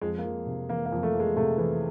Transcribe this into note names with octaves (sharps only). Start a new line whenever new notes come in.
F2 G#3
A#3
F2
C3
E3 A#3
A#3
F2
A3
F2
G#3
C3 A3
E3